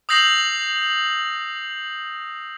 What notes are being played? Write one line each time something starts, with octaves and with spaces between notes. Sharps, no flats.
D#6 E6 G6 A#6 C7 F#7